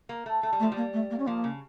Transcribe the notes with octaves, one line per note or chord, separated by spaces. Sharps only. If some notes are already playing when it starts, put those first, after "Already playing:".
A#3
A3
A3
G3
A3
F3
G3 A#3
A3
A#3
C#4
F3 A#3
C#3